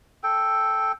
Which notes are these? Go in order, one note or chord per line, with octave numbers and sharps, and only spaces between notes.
A4 G5